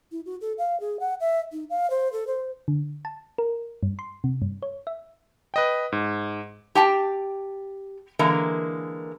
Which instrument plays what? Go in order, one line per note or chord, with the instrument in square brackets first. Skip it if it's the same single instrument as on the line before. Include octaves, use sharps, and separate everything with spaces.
[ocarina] E4
F#4
A4
F5
G#4
F#5
E5
D#4
F5
C5
A4
C5
[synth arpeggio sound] D3
A5
A#4
G2
C6
C3
G2
C#5
E5
[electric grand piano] B4 D#5 G5
G#2
[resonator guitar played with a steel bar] G4 G5 A5
D3 E3 G#3 A#3 A#4